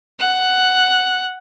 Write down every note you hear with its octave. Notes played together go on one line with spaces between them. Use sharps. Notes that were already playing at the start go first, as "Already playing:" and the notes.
F#5 F#6